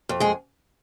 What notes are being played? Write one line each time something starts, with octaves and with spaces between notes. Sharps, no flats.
F2
G#3 G#4